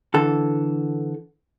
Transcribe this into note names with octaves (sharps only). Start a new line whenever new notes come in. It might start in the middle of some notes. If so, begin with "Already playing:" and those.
D3 E3 A4